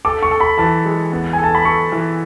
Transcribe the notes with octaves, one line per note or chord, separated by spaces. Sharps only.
A4 D6
C#6
A4
B5
E3 A5
G#3
B3
G#5
A4
A5
B5
A4 C#6
E3